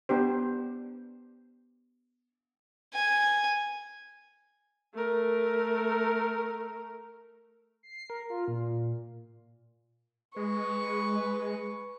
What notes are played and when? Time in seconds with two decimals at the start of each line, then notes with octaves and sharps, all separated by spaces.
0.09 B3 D4 G4 C5
2.94 G#5
4.95 A3 A#4
7.83 C7
8.10 A#4
8.30 F4
8.48 A#2
10.36 G#3 B4 C#6